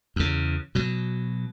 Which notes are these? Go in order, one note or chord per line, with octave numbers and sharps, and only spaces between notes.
E2 C#3
B2 F#3